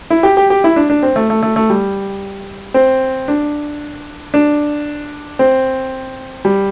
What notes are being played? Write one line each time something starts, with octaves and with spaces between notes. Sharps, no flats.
E4
G4
G4
G4
E4
D4
D4
C4
A3
A3
A3
A3
G3
C4
D4
D4
C4
G3